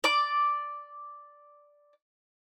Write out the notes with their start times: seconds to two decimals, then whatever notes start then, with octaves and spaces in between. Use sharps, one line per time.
0.04 D5 D6